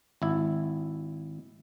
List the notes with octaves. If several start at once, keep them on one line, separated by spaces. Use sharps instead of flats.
G#1 E4